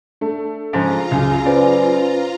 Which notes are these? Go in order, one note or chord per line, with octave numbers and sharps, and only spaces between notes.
A3 D4
G#2 C#3 F3 F4 A#5
C#2 F#2 C#3
C#4 B4 C5 D5